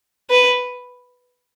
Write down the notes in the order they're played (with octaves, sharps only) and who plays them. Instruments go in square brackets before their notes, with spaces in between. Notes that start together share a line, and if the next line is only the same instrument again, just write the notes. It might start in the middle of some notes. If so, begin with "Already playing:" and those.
[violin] B4